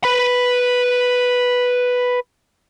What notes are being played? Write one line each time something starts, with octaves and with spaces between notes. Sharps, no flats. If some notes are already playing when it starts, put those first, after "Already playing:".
B4 B5